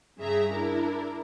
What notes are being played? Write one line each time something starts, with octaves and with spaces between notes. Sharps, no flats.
G2 C#3 G#4 E5 A#5
D4 E4 A#4